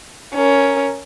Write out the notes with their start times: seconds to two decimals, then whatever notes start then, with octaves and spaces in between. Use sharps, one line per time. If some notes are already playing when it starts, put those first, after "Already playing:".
0.34 C#4 A#4